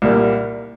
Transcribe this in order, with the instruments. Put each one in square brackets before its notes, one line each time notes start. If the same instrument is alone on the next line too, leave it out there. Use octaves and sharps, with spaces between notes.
[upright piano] C2 A#2 G3 A#3